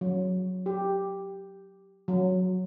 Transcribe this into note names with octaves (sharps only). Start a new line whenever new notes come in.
F#3
G4
F#3